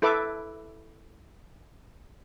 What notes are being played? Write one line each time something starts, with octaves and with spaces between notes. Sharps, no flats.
E4 A4 B4 E5 D6